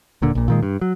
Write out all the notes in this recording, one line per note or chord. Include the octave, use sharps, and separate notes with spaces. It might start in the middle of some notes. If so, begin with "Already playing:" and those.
D#1 A#2 D3
A#1 A#2
A#2 D#3 G#3
G2
F#3